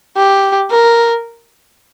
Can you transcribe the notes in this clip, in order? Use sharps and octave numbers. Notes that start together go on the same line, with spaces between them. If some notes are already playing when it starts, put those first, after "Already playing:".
G4
A#4